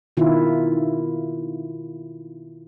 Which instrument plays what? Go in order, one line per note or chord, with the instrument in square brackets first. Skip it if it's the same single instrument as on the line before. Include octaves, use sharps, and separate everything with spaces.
[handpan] B2 D#3 E4 F4